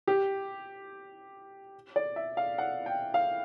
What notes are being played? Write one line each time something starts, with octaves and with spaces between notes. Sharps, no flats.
G4
D5
E5
F5
F#5
G5
F5